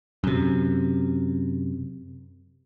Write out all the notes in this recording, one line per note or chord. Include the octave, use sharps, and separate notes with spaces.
F#2 C3